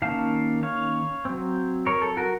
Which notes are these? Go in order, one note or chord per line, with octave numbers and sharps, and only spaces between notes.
D#3 A#3 C#4 F5 A5
C#5 F5
F#3 C4
A#4 C#5
A4
F#4 A#4